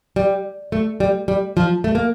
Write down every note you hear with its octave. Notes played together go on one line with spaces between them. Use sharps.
G3
A3
G3
G3
F3
A3
A#3